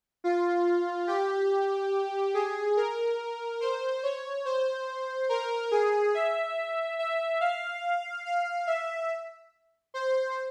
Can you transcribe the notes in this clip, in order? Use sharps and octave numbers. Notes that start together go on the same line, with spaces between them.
F4
G4
G#4
A#4
C5
C#5
C5
A#4
G#4
E5
E5
F5
F5
E5
C5